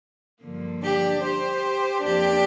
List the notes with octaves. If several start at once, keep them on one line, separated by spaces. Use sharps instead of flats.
G2 D3 F3 A#3
D4 G4
G4 C5
F2 F3 A#3 D4 G4